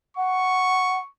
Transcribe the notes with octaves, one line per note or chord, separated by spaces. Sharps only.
F#5 C#6